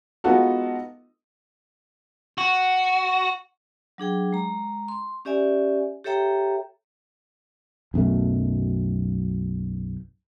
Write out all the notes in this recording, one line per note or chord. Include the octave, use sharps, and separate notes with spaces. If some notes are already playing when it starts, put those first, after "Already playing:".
G#3 B3 D#4 F4 F#4 A4
F#4
F#3 D4 G#4 G5
G#3 A#5
C6
C#4 G4 D5 E5 G#5
G4 A4 C#5 E5 G5 A#5
B1 F#2 B2 A3